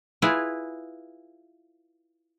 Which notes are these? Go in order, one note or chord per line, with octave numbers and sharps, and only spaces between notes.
E4 F4 G#4 B4